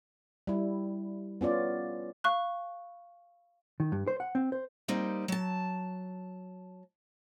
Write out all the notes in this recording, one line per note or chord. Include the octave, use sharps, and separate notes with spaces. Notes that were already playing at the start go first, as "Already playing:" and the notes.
G3 E4
B3 C#4 F4 D5
F5 C#6 F#6
D#3
G2
C5
F#5
C4
C5
G3 A#3 C4 D#4
F#3 A5